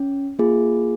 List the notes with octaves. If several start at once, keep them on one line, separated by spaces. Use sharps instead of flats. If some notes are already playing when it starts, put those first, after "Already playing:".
Already playing: C#4
A#3 F4 G#4